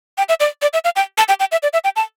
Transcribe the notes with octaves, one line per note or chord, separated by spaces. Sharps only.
G5
E5
D5
D5
E5
F5
G5
A5
G5
G5
E5
D5
E5
G5
A5